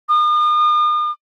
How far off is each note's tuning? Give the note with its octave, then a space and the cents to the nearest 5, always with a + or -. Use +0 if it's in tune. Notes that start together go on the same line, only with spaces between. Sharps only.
D#6 -45